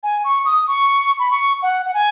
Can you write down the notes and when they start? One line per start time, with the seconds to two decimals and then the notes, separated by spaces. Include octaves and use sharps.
0.03 G#5
0.24 C#6
0.45 D#6
0.67 C#6
1.19 B5
1.31 C#6
1.63 F#5
1.86 F#5
1.94 G#5